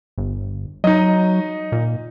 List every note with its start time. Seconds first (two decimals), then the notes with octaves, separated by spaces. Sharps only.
0.18 G1
0.84 F#3 D#4 D#5
1.72 A#2